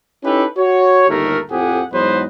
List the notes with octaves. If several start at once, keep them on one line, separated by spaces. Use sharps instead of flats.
C#4 D#4 E4 G4 A4 B4
F#4 C#5
G1 D#2 D#3 A3 A#4
F2 A2 F3 G4 G#4 F#5
E2 G#2 F#3 B4 C5 D#5